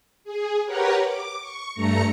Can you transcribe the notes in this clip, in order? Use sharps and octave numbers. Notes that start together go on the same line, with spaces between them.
G#4
G4 A#4 B4 C#5 F#5 A#5
D6
C#6
G2 A3 A#5 A#6 C#7